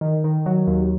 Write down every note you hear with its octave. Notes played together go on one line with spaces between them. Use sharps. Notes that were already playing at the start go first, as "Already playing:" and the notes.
D#3
D#3
F#3
D#2